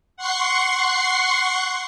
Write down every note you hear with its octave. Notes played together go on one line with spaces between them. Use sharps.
F#5 C6 C#6 C7